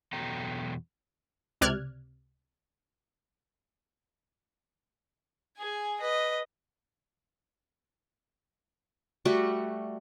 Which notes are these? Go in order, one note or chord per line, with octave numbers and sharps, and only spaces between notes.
E2 B2 F#3 A4 G5 A#5
C#2 C3 D5 F6 F#6 G#6
G#4 G#5
B4 D#5
G3 A3 F#4